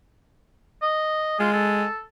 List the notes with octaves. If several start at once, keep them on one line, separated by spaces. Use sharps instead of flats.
D#5
G#3 F4
A4